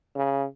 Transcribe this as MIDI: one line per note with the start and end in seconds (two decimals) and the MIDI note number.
0.15 0.45 49